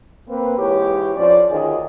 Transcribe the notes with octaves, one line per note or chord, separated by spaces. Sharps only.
A#3 C4 B4
G#2 E3 G4 C#5
F2 F3 C#4 D5
D2 D#3 C#4 F4 G#4 D#5